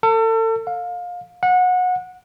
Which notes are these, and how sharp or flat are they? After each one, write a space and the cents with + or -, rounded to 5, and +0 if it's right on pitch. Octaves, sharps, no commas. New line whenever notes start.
A4 +35
F5 +25
F#5 -25